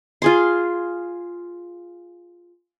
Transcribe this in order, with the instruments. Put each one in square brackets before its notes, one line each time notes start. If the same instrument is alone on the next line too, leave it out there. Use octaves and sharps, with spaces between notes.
[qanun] F4 G#4 C6